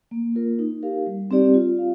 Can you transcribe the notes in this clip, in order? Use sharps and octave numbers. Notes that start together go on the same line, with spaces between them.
A#3
F4 A#4
D#4
G4 A#4 F5
G3
C4 D#4 G4 D5
F4
F5